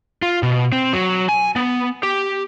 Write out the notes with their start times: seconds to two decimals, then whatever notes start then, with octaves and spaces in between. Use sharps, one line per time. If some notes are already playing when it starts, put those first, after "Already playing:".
0.22 F4
0.43 B2
0.72 C4
0.93 F#3
1.29 G#5
1.56 B3
2.03 G4